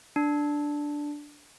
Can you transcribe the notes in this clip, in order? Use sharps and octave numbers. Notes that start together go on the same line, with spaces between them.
D4